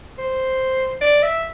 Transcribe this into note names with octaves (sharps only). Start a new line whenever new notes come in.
C5
D5
E5